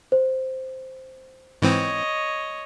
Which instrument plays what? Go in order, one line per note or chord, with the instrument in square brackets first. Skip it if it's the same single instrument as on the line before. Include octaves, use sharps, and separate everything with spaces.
[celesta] C5
[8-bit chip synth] G#2 E3 C4 [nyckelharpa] C#5 D#5